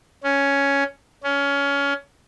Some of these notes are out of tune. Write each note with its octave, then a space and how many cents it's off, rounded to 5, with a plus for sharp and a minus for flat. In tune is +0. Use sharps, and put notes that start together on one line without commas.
C#4 +5
C#4 +20